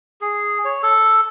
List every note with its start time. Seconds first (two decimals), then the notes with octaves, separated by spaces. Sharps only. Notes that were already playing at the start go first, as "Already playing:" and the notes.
0.21 G#4
0.65 C#5
0.83 A4